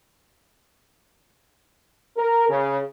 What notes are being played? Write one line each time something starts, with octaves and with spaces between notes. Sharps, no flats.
A#4
C#3